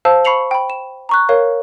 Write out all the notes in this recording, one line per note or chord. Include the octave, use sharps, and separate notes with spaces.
C5 F5 A5 E6
B5 C#6 C7 C#7 F7 F#7
G5 B5
E7
A#5 C#6 F#6
A#4 C#5 F5